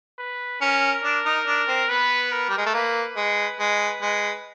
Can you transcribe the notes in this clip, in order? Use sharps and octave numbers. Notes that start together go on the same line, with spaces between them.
B4
C#4 A#4
D4
D#4
D4
C4
B3 B4
A#4
G3
G#3
A3
A#3 B4
G#3
G#3
G#3